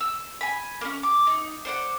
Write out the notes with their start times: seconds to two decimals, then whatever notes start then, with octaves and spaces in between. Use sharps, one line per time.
0.01 E6
0.41 G#5 B5
0.81 A#3 C#4
1.03 D6
1.27 D#4
1.65 C5 D5 F#5